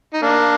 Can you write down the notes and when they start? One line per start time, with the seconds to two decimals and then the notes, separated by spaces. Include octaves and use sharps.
0.13 D#4
0.22 A#3 D4